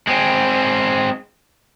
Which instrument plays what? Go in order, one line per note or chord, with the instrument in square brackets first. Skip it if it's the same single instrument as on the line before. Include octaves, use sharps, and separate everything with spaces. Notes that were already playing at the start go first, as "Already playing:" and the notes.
[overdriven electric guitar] G#3 C4